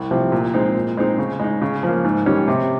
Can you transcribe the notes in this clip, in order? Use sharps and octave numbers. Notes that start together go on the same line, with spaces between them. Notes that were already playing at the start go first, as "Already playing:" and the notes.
Already playing: C2
C3 F3
A#2
G#3 C4 D#4
A#2
G#3 C4 D#4
C#3
G#3 D#4
C#3
F3 A#3
G#2
D#3 G3 C#4
C3